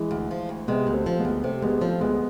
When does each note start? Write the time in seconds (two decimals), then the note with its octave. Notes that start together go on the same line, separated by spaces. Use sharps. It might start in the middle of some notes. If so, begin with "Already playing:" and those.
Already playing: E3 G#3
0.11 D2
0.31 F3
0.49 D2
0.68 C3 G#3 B3
0.87 D2
0.93 A3 C4
1.06 F3
1.19 G#3 B3
1.25 D2
1.44 C3 A3 C4
1.63 D2 G#3 B3
1.82 F3 A3 C4
2.01 D2 G#3 B3